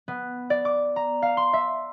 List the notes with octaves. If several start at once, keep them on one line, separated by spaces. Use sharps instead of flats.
B3
D5
D6
A#5
F5
C6
E5